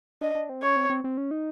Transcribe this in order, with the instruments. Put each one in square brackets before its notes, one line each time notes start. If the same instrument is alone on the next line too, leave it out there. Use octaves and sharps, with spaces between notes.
[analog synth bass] D4 [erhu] D#5
[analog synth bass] D4
C4
[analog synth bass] C#4 [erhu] C#5
[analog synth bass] C4
C4
C4
C#4
D#4